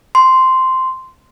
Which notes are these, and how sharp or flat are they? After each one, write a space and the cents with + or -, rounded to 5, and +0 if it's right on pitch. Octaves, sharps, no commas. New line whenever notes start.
C6 -5